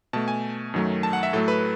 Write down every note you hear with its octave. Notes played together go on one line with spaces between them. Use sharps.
B2 A3 A5
G#5
F#2 D#3 F#3 A3
A5
F#5
E5
A2 F#3 A3 A4
B4